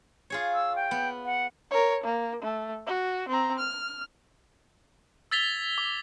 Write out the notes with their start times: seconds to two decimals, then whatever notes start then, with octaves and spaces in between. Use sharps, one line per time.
0.30 F4 G#4 C#5
0.53 E6
0.75 G5
0.91 B3
1.25 F#5
1.71 A#4 C#5
2.04 A#3
2.42 A3
2.86 F#4
3.28 C4 A#5
3.59 F6
5.31 E6 G#6 A6 B6 F7 G7
5.78 D6